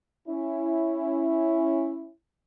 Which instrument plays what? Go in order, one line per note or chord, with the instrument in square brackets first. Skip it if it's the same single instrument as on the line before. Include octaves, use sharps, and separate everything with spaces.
[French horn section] C#4 E4